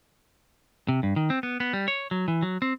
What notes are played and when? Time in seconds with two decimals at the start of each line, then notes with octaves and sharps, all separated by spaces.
0.89 C3
1.03 G2
1.16 D#3
1.30 C4
1.43 B3
1.60 B3
1.73 G3
1.88 C#5
2.11 F#3
2.28 E3
2.42 F#3
2.62 C4